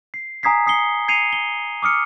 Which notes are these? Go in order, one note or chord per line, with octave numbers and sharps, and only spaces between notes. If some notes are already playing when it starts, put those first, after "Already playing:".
C7
G#5 A#5 D#6 G#6 B6 C7
A#5 D#6 C7 C#7 G7
G#6 C7 C#7 D#7 F7
G7
D6 D#6 F6 C#7